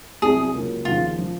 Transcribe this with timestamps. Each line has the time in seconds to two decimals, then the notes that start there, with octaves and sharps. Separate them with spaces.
0.22 C2 C3 F#3 G#4
0.54 C#2 C#3 F#3 A#3 C#4
0.85 D#2 C#3 F3 F4
1.18 F3